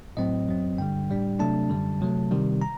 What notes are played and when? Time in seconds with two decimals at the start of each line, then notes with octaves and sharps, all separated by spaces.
0.17 A2 F#3 C4 D#5
0.48 F#2 F#3 C4
0.78 G2 D3 G3 G5
1.10 A2 G3 D4
1.40 C3 F#3 A3 D4 A5
1.70 F#2 D3 G3
2.01 C3 F#3 A3
2.31 C3 D#3 G3
2.61 A#5